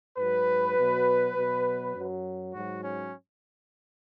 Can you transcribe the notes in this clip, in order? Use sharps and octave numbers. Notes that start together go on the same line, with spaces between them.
G#2 F#3 B4
B2 F#3
B2 F#3
F#2 F#3
G#2 F#3 F#4
C#4